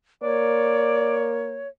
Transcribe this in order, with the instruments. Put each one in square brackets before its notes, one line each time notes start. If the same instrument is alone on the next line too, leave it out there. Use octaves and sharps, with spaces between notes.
[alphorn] A#3 [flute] C#5 [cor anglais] D5